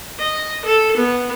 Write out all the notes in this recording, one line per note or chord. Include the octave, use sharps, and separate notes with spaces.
D#5
A4
B3